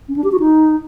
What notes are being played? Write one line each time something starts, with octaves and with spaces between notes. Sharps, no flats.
C#4
D4
G4
F#4
D#4